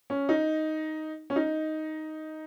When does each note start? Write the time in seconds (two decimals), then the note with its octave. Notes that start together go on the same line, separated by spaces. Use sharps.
0.10 C#4
0.29 D#4
1.30 C#4
1.36 D#4